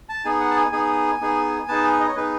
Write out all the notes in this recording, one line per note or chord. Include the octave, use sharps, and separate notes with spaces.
A5
B3 D#4 G#4 G#5
F#5
A5
G#5
B3 D#4 G#4 G#5
B3 D#4 G#4
B3 D#4 G#4 A5
G#5
D#5
C#5
B3 D#4 G#4 B4